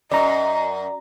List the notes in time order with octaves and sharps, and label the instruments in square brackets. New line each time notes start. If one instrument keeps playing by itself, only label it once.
[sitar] F#2 [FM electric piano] D5 A#5 [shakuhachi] D#5